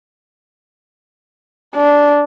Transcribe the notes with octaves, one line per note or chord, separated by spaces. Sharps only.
D4